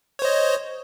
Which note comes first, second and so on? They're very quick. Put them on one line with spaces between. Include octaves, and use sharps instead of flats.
C#5 C5 D#5